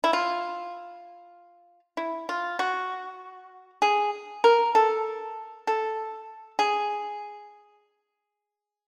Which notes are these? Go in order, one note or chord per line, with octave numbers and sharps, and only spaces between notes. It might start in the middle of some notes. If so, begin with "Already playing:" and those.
E4
F4
E4
F4
F#4
G#4
A#4
A4
A4
G#4